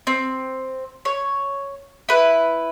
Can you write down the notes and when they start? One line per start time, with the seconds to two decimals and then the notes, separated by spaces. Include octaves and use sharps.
0.07 C4
1.05 C#5
2.09 E4 B4